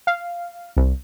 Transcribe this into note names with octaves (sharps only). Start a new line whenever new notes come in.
F5
C2